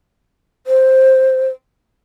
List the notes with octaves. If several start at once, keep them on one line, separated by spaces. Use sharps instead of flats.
C5